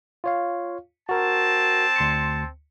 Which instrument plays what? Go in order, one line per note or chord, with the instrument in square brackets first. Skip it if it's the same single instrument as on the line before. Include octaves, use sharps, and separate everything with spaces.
[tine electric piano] F4 C#5 F5
[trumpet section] C4 A5 [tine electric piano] F#4 A#4
[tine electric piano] D2 C6 C#7